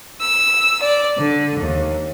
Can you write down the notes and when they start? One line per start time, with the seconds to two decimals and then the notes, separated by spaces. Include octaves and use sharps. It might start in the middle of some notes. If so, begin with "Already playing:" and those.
0.20 E6
0.81 D5
1.17 D3
1.59 D#2